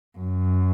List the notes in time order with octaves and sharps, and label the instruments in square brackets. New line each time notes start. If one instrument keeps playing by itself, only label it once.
[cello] F#2